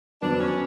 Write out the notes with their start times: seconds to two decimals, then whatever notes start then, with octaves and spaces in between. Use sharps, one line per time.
0.22 F2 D3 F#3 B3 D4
0.40 C#4